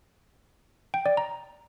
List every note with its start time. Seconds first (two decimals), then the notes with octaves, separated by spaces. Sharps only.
0.94 G5
1.06 D5
1.17 A#5